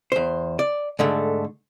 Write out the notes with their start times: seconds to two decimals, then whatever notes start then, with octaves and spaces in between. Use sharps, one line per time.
0.12 E2 C5
0.59 D5
0.99 G#2 D3 A3